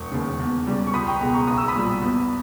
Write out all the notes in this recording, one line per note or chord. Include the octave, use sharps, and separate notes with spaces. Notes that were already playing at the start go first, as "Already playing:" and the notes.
Already playing: E1 C#6
D#2 C#3
E2
C#3 G3
C#6
C#2 B5 D#6
G5 A#5
B2 G#3 G5 A#5
A#5 C#6
B1 D#6
E6
B5 D#6
A#2 G3
E2